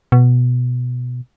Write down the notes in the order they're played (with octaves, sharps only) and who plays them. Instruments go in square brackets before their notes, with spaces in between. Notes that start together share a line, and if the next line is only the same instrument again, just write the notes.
[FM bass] B2